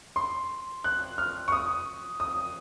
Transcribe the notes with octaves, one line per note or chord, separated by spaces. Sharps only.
C6
F#6
F6
C#6
D#6
D#6